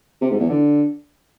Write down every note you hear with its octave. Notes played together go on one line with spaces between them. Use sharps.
C3
G#2
E2
D3